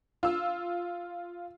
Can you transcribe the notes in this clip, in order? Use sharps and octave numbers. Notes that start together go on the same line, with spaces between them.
F4 E6